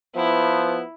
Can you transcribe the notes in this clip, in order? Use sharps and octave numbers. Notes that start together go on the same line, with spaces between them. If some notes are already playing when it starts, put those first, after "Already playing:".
F3 B3 E4